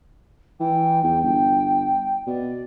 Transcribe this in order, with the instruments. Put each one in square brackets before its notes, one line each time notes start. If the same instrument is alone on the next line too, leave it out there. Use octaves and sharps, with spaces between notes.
[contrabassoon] E3 [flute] G5
[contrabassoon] E2 [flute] G5
[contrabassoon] G1 [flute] G5
[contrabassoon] B2 [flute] D5